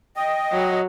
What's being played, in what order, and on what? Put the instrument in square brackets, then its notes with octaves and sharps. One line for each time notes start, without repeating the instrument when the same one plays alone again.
[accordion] D#5 [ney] G5
[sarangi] F#3